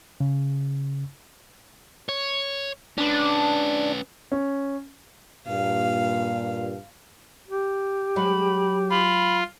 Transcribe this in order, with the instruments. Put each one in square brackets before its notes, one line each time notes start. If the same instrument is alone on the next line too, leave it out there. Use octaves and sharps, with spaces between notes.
[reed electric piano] C#3
[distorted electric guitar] C#5
[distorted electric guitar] C#4 B4 [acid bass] D4
[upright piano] C#4
[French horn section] G2 A#2 [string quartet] F5
[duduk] G4
[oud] F#3 G#3 [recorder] B5
[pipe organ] F4 [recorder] B5